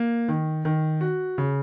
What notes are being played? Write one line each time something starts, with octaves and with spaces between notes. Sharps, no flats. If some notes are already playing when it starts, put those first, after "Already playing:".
Already playing: A#3
D#3
D#3
F#4
C#3